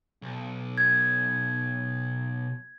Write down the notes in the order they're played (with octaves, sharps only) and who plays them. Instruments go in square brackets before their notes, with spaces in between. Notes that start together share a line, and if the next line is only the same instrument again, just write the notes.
[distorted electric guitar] B1
[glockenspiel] G#6